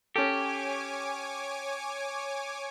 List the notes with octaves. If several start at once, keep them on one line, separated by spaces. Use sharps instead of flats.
C#4 G4 A4 C#5 G#5 D6